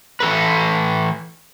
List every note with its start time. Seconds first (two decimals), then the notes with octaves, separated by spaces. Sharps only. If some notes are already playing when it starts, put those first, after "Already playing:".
0.20 E3 A4 B4